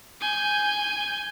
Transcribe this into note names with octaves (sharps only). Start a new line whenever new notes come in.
G#5 G6